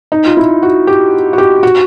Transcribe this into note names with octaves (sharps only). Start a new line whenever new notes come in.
D#4
F4
E4
F#4
G4
F#4
G4
F#4